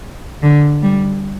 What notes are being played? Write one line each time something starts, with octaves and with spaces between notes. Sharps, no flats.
D3
G3